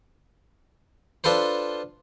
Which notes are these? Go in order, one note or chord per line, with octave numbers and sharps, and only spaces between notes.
D4 F4 A4 B4 C5